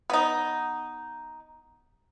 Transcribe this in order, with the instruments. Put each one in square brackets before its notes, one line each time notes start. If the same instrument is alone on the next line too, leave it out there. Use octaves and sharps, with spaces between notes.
[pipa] B3 D#4